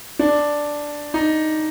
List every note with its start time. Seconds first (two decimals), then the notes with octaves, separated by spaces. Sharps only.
0.19 D4
1.14 D#4